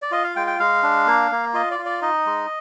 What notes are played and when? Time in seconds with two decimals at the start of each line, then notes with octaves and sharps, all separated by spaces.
0.02 D5
0.11 F4 D#5
0.24 F5
0.36 G#3 G5
0.47 G5
0.59 G#3 F5
0.83 D4
1.07 A#3
1.31 A#3
1.54 F4 D#5
1.71 D5
1.79 F4
1.86 D5
2.02 D#4 D#5
2.26 G#3